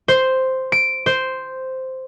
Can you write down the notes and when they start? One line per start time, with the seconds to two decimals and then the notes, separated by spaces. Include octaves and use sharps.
0.08 C5
0.72 D7
1.06 C5